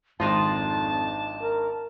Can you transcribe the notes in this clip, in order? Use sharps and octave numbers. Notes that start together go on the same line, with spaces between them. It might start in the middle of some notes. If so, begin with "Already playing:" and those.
G#1 F2 D4 D#4 F4 A5
A#4